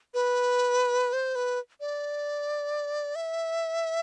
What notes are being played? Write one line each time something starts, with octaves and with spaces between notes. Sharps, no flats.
B4
C5
B4
D5
E5